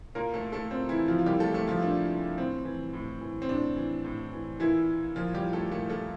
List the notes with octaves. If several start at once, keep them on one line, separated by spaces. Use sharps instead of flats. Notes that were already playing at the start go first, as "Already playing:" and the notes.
A#2 A#3 A#4
A3 A4
A3 A4
A#2 C4
E3 E4
F3 F4
F4
A#2 G3 G4
A3 A4
A3 A4
F3 F4
A#2 D4
A2 C4
E3
A2
E3
C4
A2 D4
E3
A2
E3
A#2 E3 E4
A#2 F3 F4
G3 G4
A3 A4
A#2 A3 A4
A3 A4